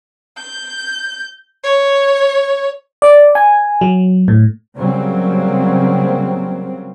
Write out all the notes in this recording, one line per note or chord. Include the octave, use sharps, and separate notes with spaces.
G6
C#5
D5
G#5
F#3
A2
C#3 F#3 G3 A#3 C4